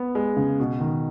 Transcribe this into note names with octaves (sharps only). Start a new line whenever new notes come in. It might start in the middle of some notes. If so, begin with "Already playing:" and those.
Already playing: B3
G#3
C#3
B2
D#3